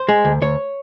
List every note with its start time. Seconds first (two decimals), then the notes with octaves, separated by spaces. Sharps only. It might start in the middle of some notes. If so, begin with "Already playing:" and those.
Already playing: C5
0.09 G#3
0.25 D2
0.42 D2 C#5